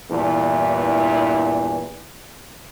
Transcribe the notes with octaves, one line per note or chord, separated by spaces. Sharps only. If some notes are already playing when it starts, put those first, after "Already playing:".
E2 G2 A#2 E3 D4